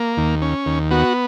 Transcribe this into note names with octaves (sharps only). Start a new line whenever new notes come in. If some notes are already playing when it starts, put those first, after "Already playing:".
Already playing: A#3
D#2
C#4
D#2
B3 F#4